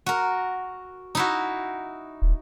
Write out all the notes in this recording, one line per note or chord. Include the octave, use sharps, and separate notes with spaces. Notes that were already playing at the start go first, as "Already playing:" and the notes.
F#4 A#4
D#4 E4 F#4
D#1